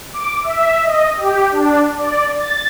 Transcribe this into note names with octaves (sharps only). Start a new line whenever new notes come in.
D6
E5
D#5
G4
D4
D5
A6